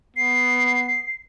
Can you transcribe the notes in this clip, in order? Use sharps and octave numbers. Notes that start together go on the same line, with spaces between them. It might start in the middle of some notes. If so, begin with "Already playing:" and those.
B3 C7